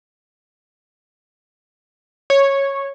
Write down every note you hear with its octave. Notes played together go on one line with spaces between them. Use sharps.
C#5